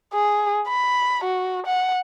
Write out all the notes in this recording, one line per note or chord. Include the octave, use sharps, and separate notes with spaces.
G#4
B5
F#4
F#5